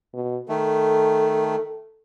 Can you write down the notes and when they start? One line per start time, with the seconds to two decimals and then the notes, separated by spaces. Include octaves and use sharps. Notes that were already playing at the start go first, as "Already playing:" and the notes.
0.14 B2
0.49 D#3 A3 A4